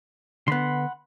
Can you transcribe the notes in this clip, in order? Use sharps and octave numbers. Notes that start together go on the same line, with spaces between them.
D3 B3 F#5 B5 C6